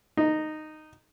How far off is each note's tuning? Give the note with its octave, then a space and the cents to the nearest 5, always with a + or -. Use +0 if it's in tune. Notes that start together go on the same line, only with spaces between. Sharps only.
D#4 -10